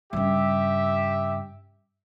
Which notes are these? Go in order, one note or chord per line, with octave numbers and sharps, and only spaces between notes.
G2 C#3 G4 E5